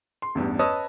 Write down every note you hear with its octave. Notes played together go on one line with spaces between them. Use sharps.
C6
A1 E2 G2
B4 C#5 D#5 A5 D#6 E6